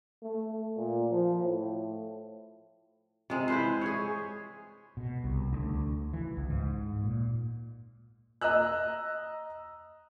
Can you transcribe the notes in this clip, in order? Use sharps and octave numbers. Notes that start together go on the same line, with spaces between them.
A3
A#2
F3
A2
C3 G#3
E4 B4 C5
G#4 C#5
B2
C2
D2
E3
C#2
G#2
A#2
D#5 A#5 E6 F#6